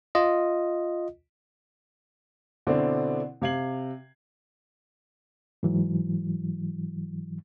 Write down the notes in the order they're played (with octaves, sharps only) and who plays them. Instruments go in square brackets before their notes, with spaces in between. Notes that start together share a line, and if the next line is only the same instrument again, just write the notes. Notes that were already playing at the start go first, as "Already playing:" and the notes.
[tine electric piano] F4 D#5
[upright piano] B2 D3 C4 D4 E4
C3 F5 G#6 C7 F#7
[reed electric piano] G#2 E3 F#3